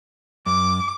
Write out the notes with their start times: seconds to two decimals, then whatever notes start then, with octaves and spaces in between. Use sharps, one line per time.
0.46 F#2 D6